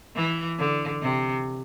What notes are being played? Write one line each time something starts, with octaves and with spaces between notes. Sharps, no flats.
E3
D3
C3